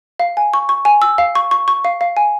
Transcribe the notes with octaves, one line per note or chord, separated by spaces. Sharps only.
F5
G#5
C#6
C#6
G#5
E6
F5
C#6
C#6
C#6
F5
F5
G#5